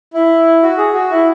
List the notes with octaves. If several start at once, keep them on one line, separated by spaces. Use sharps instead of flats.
E4
F#4
G#4
F#4
E4